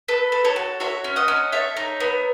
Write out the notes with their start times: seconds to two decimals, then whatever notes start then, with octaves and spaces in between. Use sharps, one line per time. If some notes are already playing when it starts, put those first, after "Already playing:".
0.08 A4 B4
0.32 A4
0.44 A4 C#5
0.56 F#4
0.80 F#4 C#5 E5
1.04 C#4
1.16 D#5 F#5
1.28 C#4
1.52 A4 C#5 E5
1.77 D#4
2.00 B3